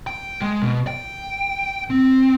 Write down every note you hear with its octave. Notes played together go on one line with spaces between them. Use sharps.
G5
G#3
B2
G5
C4